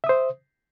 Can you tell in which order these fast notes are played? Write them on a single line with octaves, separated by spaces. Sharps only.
E5 D#6 C5